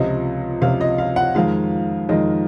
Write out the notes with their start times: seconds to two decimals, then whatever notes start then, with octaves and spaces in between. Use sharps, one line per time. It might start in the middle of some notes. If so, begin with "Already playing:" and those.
Already playing: C#2 C3 F3 D#5
0.62 C#2 C3 F3 F5
0.81 D#5
0.98 F5
1.16 F#5
1.35 F2 D#3 G#3 F5
2.09 F2 D#3 G#3 D#5